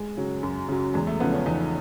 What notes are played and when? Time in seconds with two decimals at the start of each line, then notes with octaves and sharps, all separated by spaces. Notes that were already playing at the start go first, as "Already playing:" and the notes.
Already playing: G#3
0.17 C#3 F#3
0.43 F#2
0.69 C#3 F#3
0.94 E2 G#3
1.07 A3
1.20 C#3 F3 B3
1.34 C#4
1.46 E2 D#4